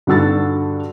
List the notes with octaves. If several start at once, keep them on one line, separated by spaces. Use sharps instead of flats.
G2 D3 F#4 E6 A6